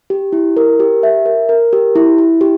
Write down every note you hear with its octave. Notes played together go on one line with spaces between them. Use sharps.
G4
E4
A#4
G4
E5
A#4
A#4
G4
E4
E4
G4